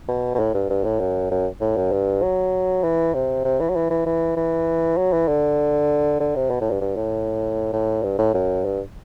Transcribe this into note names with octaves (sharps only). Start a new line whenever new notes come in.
B2
B2
A2
G2
G2
A2
F#2
F#2
A2
F#2
G2
F#3
E3
C3
C3
E3
F#3
E3
E3
E3
E3
F#3
E3
D3
D3
C3
B2
A2
G2
G2
A2
A2
G2
A2
F#2
G2